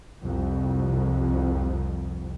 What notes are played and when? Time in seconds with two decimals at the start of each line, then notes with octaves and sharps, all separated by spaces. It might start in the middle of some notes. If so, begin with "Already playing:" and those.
0.22 C2 F2